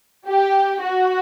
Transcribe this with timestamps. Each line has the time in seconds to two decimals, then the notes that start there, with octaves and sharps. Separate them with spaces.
0.27 G4
0.83 F#4